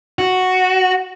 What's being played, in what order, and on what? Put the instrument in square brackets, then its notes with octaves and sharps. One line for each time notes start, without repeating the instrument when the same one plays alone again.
[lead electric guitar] F#4